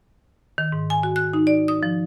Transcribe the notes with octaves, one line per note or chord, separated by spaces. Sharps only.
D#3
G#2
G#5
F#4
F#6
D#4
D5
D#6
F3